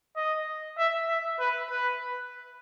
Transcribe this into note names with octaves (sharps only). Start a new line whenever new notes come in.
D#5
E5
E5
B4
B4